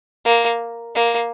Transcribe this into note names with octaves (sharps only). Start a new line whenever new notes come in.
A#3
A#3